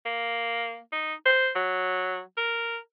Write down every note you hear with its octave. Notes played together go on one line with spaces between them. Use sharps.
A#3
D#4
C5
F#3
A#4